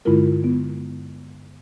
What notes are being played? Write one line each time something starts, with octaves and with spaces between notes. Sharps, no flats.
G2 D3 G#3 E4 F4 A#4
B3